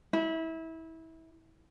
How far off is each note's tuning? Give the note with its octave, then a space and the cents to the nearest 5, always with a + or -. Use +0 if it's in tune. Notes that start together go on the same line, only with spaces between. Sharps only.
E4 -25